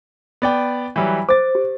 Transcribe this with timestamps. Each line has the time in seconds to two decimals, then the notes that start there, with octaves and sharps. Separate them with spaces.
0.42 B3 D5 G5
0.96 E3 F#3 G3
1.29 C5 D6 A6
1.55 G4